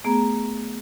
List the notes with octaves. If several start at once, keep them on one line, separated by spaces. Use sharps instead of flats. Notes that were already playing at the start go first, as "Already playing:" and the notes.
A3 B3 G#4 A#5